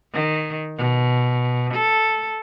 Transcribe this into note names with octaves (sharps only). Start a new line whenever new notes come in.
D#3
B2
A4